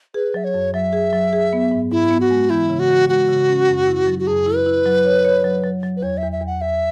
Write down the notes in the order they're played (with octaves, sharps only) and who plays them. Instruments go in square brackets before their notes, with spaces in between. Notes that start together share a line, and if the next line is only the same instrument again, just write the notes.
[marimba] G#4 [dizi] B4
[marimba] F#3 [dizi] E5
[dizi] C#5
[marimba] F#2
[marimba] F#3 [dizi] E5
[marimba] G#4
F#3
G#4
B3
G#2
[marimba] G#2 [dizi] E4
[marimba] B3
[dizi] F#4
[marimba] G#3
[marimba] E3 [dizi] E4
[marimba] C#3
[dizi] F#4
[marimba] E3
[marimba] G#3 [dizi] F#4
[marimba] C#3
C#4
F#2
E4
F#3
[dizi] F#4
[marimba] F#2 [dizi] G#4
[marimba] E4
[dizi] B4
[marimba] E4
F#3
C#5
C#5
F#3
F#3
F#3
[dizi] B4
[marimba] E2 [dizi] C#5
[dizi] E5
[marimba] E2
[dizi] E5
[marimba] E2 [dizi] F#5
[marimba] E2 [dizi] E5